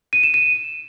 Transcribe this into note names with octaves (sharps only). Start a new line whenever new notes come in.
D#7
E7
D#7